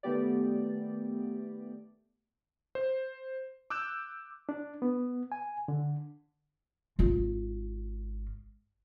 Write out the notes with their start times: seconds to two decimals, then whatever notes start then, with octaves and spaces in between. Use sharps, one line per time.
0.03 D#3 A3 B3 G4 D5
2.75 C5
3.70 D6 E6 F#6 G6 E7
4.49 D4
4.82 B3
5.32 G#5
5.68 D3
6.99 G#1 F4